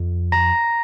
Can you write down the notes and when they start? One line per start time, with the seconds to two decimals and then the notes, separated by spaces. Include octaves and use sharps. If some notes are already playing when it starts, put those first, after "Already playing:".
Already playing: F2
0.32 A#5 A#6